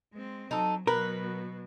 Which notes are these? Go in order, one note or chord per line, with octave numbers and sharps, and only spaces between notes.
G#3 C4
F#3 D#4 A4
B2 F#3 A#4 B4